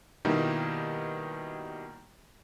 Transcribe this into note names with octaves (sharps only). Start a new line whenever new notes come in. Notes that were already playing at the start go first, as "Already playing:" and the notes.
B2 D#3 G3 A#3 D#4 E4